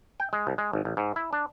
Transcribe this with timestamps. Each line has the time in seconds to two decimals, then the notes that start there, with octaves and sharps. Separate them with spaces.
0.20 G5
0.33 G#3
0.47 C2
0.58 G#3
0.73 G#1
0.85 A1
0.97 G#2
1.16 E4
1.33 D4